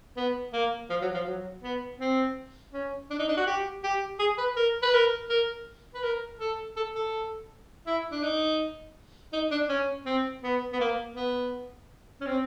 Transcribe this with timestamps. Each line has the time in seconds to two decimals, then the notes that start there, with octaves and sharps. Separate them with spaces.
0.17 B3
0.53 A#3
0.90 F3
1.02 F#3
1.14 F3
1.27 F#3
1.63 B3
1.99 C4
2.73 C#4
3.10 D4
3.19 D#4
3.28 D4
3.37 F#4
3.47 G4
3.84 G4
4.19 G#4
4.38 B4
4.57 A#4
4.83 B4
4.94 A#4
5.30 A#4
5.94 B4
6.03 A#4
6.40 A4
6.76 A4
6.95 A4
7.87 E4
8.11 D4
8.24 D#4
9.33 D#4
9.51 D4
9.69 C#4
10.06 C4
10.43 B3
10.73 B3
10.80 A#3
11.16 B3
12.20 C#4
12.27 C4